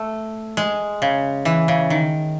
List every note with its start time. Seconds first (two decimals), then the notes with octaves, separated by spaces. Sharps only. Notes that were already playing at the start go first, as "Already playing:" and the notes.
Already playing: A3
0.57 G#3
1.02 C#3
1.45 E3
1.68 C#3
1.90 D#3